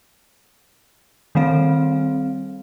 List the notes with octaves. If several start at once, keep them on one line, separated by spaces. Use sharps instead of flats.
D#3 G3 C4 F5